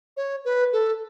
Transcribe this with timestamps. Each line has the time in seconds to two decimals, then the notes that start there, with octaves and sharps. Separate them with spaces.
0.17 C#5
0.45 B4
0.73 A4